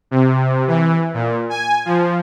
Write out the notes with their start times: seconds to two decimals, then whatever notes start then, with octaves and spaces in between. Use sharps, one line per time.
0.11 C3
0.67 E3
1.14 A#2
1.50 G#5
1.85 F3